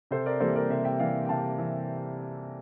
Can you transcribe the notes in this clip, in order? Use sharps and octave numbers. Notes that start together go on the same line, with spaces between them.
C3 A4 C5
A#4 D5
E3 G3 A#3 A4 C5
A#4 D5
C3 C5 E5
E5 G5
E3 G3 A#3 D5 F5
G5
C3 F5 A5
E3